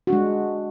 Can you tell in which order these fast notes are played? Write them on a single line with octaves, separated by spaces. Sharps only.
F#4 D4 G#3